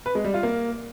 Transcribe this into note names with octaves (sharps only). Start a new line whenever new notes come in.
B4
G#3
G3
F4
A#3